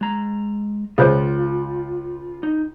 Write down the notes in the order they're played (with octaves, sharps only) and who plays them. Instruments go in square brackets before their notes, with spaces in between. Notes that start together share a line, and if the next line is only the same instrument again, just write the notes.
[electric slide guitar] G#3 A#5
[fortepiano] C#2 [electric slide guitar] F4 [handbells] G#4 B4 C5
[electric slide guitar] D#4